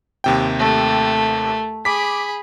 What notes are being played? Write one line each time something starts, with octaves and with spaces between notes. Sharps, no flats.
D#2 C3 G5
A3
G#4 B5 D6 B6